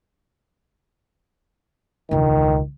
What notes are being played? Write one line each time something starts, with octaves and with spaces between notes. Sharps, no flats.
E1 C#2 D#3